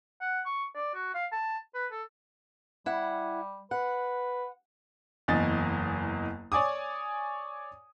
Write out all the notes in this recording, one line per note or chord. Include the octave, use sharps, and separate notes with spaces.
F#5
C#6
D5
F#4
F5
A5
B4
A4
G3 E4 F#5
B4 F#5
F#1 E2 D#5 G#5 A6
C#5 D5 G#5 D6 D#6